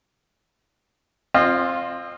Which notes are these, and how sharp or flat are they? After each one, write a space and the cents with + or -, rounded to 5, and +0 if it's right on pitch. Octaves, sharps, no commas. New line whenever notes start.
C4 +20 F4 +0 D#5 -30